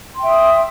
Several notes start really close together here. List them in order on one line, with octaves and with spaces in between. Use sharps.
C6 G5 E5 D#6